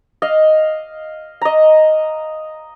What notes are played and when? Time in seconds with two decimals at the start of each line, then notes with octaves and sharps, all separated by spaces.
0.22 D#5 F5
1.41 D#5 A#5